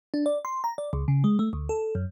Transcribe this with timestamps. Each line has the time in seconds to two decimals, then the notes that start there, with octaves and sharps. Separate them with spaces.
0.14 D4
0.26 D5
0.45 C6
0.64 A#5
0.78 D5
0.93 C#2
1.08 C#3
1.24 G#3
1.39 A3
1.53 D2
1.69 A4
1.95 F#2